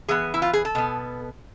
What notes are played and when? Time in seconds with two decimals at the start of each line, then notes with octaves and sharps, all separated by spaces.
0.08 E3 B3 G#4
0.34 E4
0.42 F4
0.53 G#4
0.65 A4
0.75 B2 B3